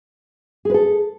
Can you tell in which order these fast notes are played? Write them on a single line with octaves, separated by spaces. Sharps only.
G#4 B4 A4